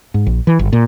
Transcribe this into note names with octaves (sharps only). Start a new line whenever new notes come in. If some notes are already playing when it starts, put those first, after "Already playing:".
G#2
A#1
E3
G1
A#2